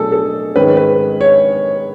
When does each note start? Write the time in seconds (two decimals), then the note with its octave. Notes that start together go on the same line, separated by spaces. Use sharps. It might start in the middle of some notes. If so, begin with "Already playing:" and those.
Already playing: B2 F#3 A3 D4 G#4 A4
0.12 A4
0.56 G#2 D#3 G#3 C#4 B4
0.77 B4
1.21 C#5